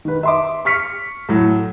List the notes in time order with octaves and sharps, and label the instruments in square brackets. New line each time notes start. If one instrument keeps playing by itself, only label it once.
[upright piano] D#3 B4
E5 C6 D6
C#6 F6 B6 C#7
A2 F#3